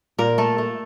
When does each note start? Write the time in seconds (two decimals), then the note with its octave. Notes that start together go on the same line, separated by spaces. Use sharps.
0.18 A#2 A#4
0.38 A3 A4
0.58 A3